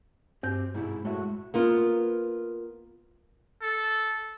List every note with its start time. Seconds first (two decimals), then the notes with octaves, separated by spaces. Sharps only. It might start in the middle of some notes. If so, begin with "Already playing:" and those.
0.43 G2 C4 G4 G6
0.74 G#2 B2 E4
1.05 A2 G#3 F#4 E5
1.54 A#3 B3 F4
3.62 A4